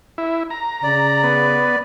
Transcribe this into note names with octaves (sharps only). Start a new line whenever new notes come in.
E4
A#5
C#3 D5
B3